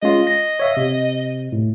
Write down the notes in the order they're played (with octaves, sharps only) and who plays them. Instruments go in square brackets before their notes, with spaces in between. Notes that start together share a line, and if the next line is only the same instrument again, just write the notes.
[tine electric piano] G#3 C#4 F4 [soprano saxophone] D#5
[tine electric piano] A#6
C#5 E5 F5
C3
A2